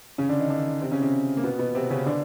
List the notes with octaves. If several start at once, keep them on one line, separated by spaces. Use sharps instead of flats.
C#3 C#4
D3 D4
D#3 D#4
D3 D4
C3 C4
C#3 C#4
C3 C4
A#3
B2 B3
B2 B3
C3 C4
C#3 C#4
D3 D4